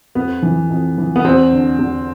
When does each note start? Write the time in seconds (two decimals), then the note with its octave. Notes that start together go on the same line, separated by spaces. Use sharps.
0.15 F2 B3
0.43 E3
0.70 F2
0.98 E3
1.16 B3
1.24 E2 C4
1.52 D3
1.79 E2